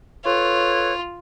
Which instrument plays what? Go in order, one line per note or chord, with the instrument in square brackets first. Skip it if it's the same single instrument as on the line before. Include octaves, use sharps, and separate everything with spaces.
[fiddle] F4 [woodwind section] A4 B4 C#5